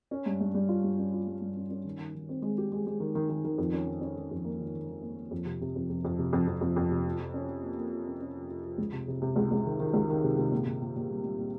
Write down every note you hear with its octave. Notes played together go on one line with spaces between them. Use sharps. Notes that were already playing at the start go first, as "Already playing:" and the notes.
C#4
G2
G2
G3
F4
G2
C#4
F4
G3
G2
C#4
C#4
D#3
D#3
D#3
C4
G#3
G4
G#3
G#3
D#3
D#3
D#3
D#3
F2
C#4
D#3
C#4
D#3
F2
A#3
D#3
D#3
D#3
A#3
A#3
F2
C3
C3
F2
F2
F2
C3
F2
F2
F2
F2
C3
F3
F3
C#4
F3
A#3
A#3
F3
C#4
C#4
F3
F3
F3
C#2
C3
C3
C3
C#2
C#2
D#3
D#3
C#2
D#3
C3
C3
A#2
A#2
A#2
A#2
G3
G3
A#2